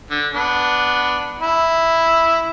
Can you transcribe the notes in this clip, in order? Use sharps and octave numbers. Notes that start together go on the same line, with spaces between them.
D3
B3 D4
E4